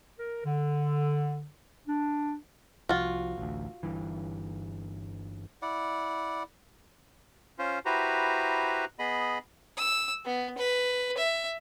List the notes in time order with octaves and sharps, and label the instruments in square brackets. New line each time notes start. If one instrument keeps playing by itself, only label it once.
[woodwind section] A#4
D3
D4
[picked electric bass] C2 F3 [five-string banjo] F4 F#4
[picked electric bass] A1 D2
G1 G2 E3
[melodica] E4 D5 F#5
[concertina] C#4 F4 C5
E4 F#4 G4 B4 C5 A#5
B3 G#4 D#5 B5
[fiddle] E6
B3
B4
E5